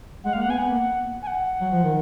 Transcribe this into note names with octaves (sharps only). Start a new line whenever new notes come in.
G#3 F#5
F5
A#3
F#5
B3
G#5
B3 F#5
A#3
G#5
F#5
F#3
F3
D#3